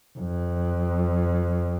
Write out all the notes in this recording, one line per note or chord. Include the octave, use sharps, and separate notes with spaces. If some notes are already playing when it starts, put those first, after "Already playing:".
F2